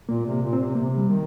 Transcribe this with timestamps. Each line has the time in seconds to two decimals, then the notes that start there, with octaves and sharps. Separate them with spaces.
0.08 A#2 A#3
0.25 C3
0.31 A#3
0.42 A#2
0.53 C4
0.58 C3
0.75 C3 A#3
0.97 G3
1.09 D#3